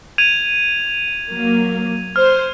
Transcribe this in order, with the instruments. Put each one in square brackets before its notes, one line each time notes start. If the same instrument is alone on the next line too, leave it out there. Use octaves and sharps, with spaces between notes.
[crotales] G#6 D#7 F7
[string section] F#3 A#3
[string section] C5 [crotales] F6